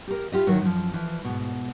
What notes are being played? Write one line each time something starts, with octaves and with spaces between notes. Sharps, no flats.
G4 A#4
E4 F4 G4 D#5
D2 D#3 F#3 E4 A#4 C#5
F#2 F3
E3 F3
G#2 B2